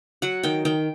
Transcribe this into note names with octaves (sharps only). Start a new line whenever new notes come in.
F#3 F#5
D#3 G5
D#3 G5